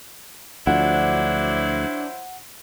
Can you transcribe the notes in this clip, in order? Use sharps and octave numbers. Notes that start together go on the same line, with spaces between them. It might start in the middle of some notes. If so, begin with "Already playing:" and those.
D2 F3 F#3 D4 E4 C5 F#5